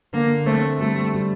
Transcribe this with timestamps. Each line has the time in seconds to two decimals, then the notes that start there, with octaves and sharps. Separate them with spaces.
0.13 D3 A#3
0.46 A3 C4
0.80 G3 A3
1.14 G3